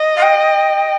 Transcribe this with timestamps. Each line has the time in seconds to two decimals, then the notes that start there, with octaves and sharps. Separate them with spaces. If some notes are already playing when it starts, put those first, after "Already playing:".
Already playing: D#5
0.16 F5
0.22 G5